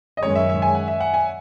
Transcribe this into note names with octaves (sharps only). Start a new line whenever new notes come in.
D#5
F#2 D#3 G#3 C#4 C#5
E5
E5
G#5
F#5
E5
F#5
G#5